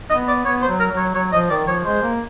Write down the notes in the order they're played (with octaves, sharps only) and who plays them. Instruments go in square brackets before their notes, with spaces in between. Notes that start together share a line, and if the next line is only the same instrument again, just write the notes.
[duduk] B3 [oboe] D#5
[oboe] D5
[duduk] B3 [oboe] C#5
[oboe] C5
[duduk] F#3
[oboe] A#4
[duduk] F#3
[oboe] C#5
[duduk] F#3 [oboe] C#5
[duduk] F3 [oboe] D#5
[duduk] D#3 [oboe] D5
[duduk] F3 [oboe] C#5
[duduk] G#3 [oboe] C5
[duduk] A#3